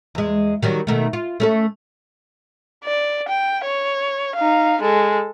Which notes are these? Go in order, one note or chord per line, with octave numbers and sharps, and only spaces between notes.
E2 G#3
D#3 F#3 G3
B2 D#3 A3
F4
A3 C#4 A4
D5
G5
C#5
D#4 F5
G#3 A4